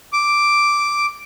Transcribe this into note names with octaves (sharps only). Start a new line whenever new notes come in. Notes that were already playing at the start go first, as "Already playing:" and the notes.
D6